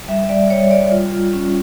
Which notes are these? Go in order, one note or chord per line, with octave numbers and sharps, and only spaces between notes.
G3 E5
E5
G3 D5
G3 C#5
G3 D5
F4
F4
C#4